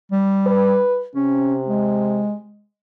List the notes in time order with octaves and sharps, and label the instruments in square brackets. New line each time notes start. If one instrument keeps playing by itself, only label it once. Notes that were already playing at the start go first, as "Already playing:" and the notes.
[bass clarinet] G3
[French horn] B4
[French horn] C3 [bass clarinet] C#4
[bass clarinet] G#3